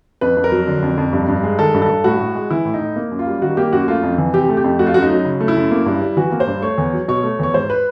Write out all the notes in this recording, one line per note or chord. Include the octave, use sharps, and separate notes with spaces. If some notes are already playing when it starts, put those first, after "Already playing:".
F2 B4
F2
A#4
F#3
D3
F2
F2
G2
G2
G#3
D#3 A4
G2
A4
G2
A2 F#4
A2
G#3
E3 E4
A2
D#4
A2
A#3
F#2
F4
G3
D#3 F#4
A#3 G4
F#2 F#4
A3 F4
F2
E3
C3 G4
A3
G4
F2
A3 F#4
F4
F#2 F#4
D#4
F#3
C#3
A3
E4
F#2
A#3
G2
G3
E3 F#4
A#3
C5
G2
A3 C#5
E2
F#3
B2 C#5
A3
E2 C#5
G#2 C5
B4